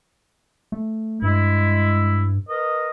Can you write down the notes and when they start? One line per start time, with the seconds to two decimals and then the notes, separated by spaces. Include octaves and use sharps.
0.72 A3
1.22 G2 G#3 E4
2.49 A#4 B4 D#5